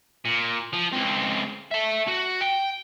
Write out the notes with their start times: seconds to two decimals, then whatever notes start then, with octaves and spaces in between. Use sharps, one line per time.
0.25 A#2
0.73 F3
0.93 C#2 C4
1.71 E5 A5
2.08 F#4
2.41 G5